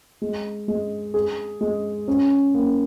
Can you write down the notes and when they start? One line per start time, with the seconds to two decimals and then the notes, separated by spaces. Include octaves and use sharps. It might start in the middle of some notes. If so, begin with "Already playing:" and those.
0.22 G#3
0.68 G#3
1.14 G#4
1.61 G#3
2.08 C#4
2.54 A#3